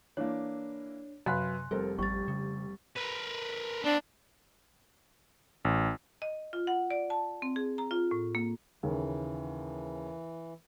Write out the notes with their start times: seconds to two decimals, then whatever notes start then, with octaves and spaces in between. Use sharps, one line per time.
0.17 E3 A#3 D4 C#5
1.26 F#2 C3 B4 F5 G#5 B5 C6 F#6
1.71 F1 G3 C4 A4 A#4
1.99 G#1 G3 C#6 A6
2.28 C#3
2.96 A#4 B4
3.84 B3 C4 D4
5.65 A1
6.22 D#5
6.53 F4
6.67 F#5
6.91 D5
7.10 A5
7.42 C4
7.56 G#4
7.78 A#5
7.91 F4
8.11 A2
8.35 A#3
8.83 D#2 C#3 E3